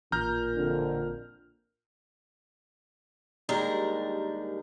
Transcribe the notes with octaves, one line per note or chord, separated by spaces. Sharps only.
A1 A#2 A#5 F6 G6
F2 D3
D#2 G3 G#3 D4 A#4 A#5